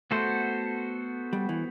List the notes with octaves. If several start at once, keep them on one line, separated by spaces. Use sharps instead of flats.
A3 B3 F#4 A4 C5
G3
E3